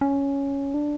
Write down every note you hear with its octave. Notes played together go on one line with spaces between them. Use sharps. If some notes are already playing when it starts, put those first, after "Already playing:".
C#4
D4